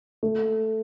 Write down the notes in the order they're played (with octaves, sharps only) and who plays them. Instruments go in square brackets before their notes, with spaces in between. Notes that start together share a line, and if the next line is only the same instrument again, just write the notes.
[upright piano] A3